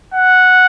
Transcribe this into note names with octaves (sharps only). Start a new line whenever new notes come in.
F#5